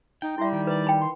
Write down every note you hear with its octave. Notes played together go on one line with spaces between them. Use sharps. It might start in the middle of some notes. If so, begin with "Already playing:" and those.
D#4 G5
G3 E4 E5 C6
D#3 G5
B4 D5
G5 B5
C6